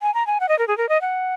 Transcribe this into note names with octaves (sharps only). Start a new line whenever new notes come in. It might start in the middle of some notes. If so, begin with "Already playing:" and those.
G#5
A#5
G#5
F#5
D#5
A#4
G#4
A#4
D#5
F#5